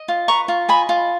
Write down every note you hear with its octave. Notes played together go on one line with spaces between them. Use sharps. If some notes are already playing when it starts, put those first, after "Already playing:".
Already playing: D#5
F4
B4 A#5 C#6
F4
D#5 G#5 B5
F4